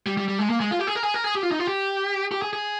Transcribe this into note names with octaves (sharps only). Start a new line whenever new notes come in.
G3
G3
G3
G#3
A#3
G#3
F4
G4
G#4
A#4
G#4
A#4
G#4
G4
F4
D#4
F4
G4
G4
G#4
G#4